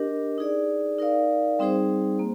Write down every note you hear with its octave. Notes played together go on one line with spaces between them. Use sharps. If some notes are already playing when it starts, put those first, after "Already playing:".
Already playing: D4 G4 A#4 D#5
D#4 G#4 D5
D#4 A#4 D5 F5
G3 C4 D#4 G#4 C5
A#3